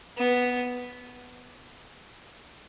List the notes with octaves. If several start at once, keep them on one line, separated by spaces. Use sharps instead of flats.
B3